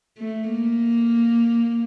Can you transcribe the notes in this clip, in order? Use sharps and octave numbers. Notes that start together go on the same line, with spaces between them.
A3
A#3